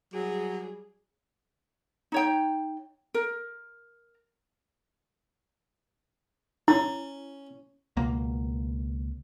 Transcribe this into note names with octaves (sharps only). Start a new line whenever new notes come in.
F#3 G3 G#4
D#4 C#5 G5
A#4
C#4 E4
C#2 B2 A#3